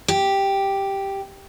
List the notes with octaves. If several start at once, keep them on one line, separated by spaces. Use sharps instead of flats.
G4